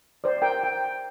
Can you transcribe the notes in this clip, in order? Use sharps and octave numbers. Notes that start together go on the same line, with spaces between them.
C5 D5
A#4 G5
G5